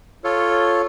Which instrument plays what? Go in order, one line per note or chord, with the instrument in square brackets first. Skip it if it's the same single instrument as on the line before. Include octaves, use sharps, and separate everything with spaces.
[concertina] F4 A4 C#5